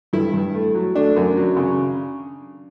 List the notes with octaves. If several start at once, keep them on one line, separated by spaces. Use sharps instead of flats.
G2 E4
G2
A3
F#3
A3 D4
F#2
F#3
C#3